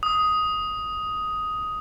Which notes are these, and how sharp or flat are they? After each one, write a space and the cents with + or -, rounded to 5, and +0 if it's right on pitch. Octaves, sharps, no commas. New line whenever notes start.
D#6 +10